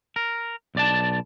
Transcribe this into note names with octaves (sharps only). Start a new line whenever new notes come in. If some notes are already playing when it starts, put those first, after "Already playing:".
A#4
B1 D5 A5